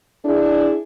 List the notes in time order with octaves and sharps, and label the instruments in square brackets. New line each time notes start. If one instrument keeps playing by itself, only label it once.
[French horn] D4 [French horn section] E4 G#4